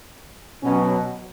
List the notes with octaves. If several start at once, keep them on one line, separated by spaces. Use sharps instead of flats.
B2 F#3 C#4